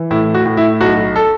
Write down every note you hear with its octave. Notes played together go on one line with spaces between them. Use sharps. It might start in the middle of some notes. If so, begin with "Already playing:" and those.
Already playing: E3
A2 E4
F#4
A2
E4
B1 F#4
A4